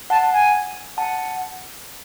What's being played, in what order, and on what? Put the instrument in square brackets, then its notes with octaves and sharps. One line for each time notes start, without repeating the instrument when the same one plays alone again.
[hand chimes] F#5 [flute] A5
[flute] G#5
[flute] F#5 [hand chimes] A5